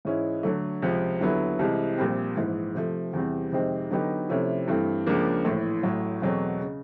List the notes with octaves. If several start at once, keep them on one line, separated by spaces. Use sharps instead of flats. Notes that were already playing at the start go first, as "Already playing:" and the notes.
G#2 E3 G#3 C#4 E4
D3 F#3 A3
C#2 C3 F3
D#2 D3 F#3 B3 E4
C2 C3 E3 G#3
A#1 A#2 G3 C4
A#1 G#2 E3
C3 F3 A3
E2 C3 E3 G3 C4
F2 C3 D#3 G#3 C4
D3 F#3 B3 D#4 G4
C3 F3 A3 C#4 E4
G2 E3 A3 C4
C#2 C#3 F3 A#3 D4
A#1 A2 E3
A1 A2 F#3
E2 B2 F#3 A3 C4
C#3